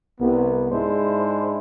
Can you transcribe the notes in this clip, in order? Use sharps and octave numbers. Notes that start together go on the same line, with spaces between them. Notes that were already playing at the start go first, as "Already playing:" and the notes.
C2 B3
G#2 G#3 D4 E4 C5